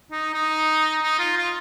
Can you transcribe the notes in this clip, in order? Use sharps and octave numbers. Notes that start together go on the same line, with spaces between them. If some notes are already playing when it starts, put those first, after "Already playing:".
D#4
D#4
D#4
F4
F4